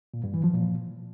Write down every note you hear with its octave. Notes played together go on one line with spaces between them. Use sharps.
A#2
G2
E3
F3
A#2